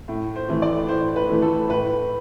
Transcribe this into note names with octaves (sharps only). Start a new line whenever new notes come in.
A2
C5
E3 A3
D5
A2 C5
B4
E3 A3
A4
A2 B4